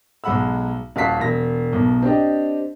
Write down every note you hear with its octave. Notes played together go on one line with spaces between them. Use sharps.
B1 G#3 F#5 B5 E6
D#1 F#4 F5 A5 B6 C7
E1 A#6
B1 B2
C4 D4 G4 D#5